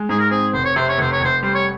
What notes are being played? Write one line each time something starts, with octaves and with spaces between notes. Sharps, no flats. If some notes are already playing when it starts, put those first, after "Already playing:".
Already playing: G#3
G#2 G#4
A#4
C4 G#4
F1 C5
C#5
C3 C5
C#5
F1 C5
C#5
F1 C5
G3 C5
C#5